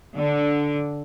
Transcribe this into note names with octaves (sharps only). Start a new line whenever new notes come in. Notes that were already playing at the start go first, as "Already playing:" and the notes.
D3